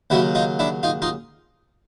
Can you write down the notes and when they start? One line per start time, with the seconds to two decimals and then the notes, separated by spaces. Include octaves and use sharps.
0.10 D#2 C#3 F#3 E4 F#4
0.35 D#4 F4
0.59 D4 E4
0.83 D#4 F4
1.02 D#4 F4